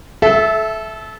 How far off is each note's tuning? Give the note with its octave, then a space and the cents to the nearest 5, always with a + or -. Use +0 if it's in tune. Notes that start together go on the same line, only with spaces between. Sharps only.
A4 -25 E5 +0